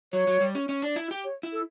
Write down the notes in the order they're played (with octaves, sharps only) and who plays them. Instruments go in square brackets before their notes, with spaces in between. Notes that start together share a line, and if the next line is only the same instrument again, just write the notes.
[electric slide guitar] F#3 [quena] C#5
[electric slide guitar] F#3
G3
C#4
C#4
D4
E4
G4
[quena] C#5
[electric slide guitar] E4
[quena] A4